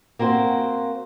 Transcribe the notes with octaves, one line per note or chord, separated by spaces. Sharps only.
A#3 C4 F#4 C5